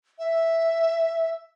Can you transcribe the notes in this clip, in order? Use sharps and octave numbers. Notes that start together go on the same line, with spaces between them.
E5